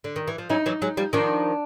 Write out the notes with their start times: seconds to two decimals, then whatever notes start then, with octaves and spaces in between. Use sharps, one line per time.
0.04 D3
0.16 D#3
0.27 E3
0.38 F3
0.49 E3 F#3 D#4
0.66 E3 F#3
0.82 F#3 G#3
0.97 F3 G3
1.13 D#3 F3 D4